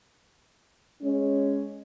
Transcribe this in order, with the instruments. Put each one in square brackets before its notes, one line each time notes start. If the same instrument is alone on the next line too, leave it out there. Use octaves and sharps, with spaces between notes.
[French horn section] G#3 C#4